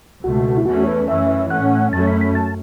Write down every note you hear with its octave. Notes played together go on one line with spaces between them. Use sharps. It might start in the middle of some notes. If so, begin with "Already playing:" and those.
C#2 B2 A3 F#4
E4
E2 E3 A3 C#4 F#4
C#5
B4
F#2 E3 C#4 E5
A2 A3 C#4 F#5
F#2 F#3 A3 C#4 A5
B5
B5
A5